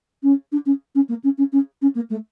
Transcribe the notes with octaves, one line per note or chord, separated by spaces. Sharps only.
C#4
D4
C#4
C#4
A#3
C#4
C#4
C#4
C#4
A#3
A3